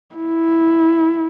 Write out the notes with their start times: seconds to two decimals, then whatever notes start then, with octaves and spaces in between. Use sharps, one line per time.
0.15 E4